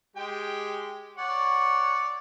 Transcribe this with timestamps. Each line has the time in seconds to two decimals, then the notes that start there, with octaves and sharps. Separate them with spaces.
0.16 G#3 G4 G5
1.18 C#5 D5 F#5